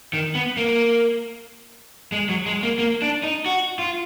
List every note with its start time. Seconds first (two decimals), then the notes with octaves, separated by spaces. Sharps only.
0.13 D#3
0.35 B3
0.57 A#3
2.12 G#3
2.29 F#3
2.46 G#3
2.63 A#3
2.79 A#3
3.02 D4
3.23 D#4
3.46 F#4
3.79 F4